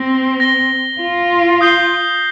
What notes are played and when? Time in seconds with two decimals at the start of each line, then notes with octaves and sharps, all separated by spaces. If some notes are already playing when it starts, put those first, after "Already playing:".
Already playing: C4 A#6 G7
0.40 A#6 G7
1.01 F4
1.61 D#6 G6 C7 G7